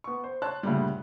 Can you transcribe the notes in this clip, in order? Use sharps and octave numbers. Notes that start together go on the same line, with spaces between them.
B3 C#6
C5
C#5 A5 C6 F#6
D2 G2 A#2 C#3 G3